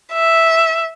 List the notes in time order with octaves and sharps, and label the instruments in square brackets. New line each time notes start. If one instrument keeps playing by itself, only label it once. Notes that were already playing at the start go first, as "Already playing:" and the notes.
[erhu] E5